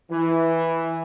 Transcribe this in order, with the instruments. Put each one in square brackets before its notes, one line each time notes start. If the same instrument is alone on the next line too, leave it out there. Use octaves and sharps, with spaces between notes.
[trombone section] E3